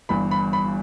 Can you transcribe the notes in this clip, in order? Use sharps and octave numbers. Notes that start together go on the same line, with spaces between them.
G1 G2 E3 B5
B5
B5